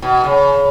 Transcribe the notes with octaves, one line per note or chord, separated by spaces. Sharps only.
B2
C#3